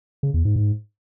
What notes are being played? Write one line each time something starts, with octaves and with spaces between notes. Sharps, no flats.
C#3
E2
G#2
G#2